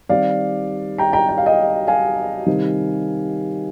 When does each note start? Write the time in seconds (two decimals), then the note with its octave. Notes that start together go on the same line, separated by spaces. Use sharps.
0.09 D#3 G3 C4 D5 F5
0.98 G5 A#5
1.13 G5 A#5
1.29 G5
1.38 F5
1.46 D#5 G5
1.88 F5 G#5
2.46 C3 D#3 G3 C4